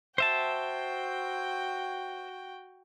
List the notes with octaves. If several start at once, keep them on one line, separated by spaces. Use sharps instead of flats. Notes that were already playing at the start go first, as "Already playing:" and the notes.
F#4 C5 E5 G5 A5